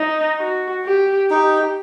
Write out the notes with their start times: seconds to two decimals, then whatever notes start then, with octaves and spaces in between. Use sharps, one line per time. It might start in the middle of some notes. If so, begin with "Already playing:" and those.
Already playing: D#4
0.39 F#4
0.85 G4
1.30 D#4 G4